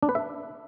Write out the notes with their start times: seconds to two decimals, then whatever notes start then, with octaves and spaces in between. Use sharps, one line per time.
0.03 D4
0.09 B4
0.15 E5